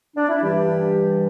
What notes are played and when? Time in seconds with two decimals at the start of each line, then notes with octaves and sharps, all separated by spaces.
0.17 D4
0.29 E4
0.41 G2 E3 G3 G4